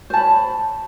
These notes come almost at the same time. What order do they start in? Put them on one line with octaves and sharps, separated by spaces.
C5 A5 B5 C#5